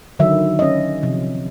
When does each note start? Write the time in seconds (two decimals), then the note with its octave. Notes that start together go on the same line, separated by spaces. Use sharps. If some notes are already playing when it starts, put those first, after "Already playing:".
0.19 D3 D#3 F#3 E5
0.59 C#4 D#5
1.03 C3 F3